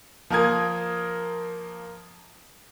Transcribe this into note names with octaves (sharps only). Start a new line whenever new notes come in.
F3 A#3 A#4 D#6 G#6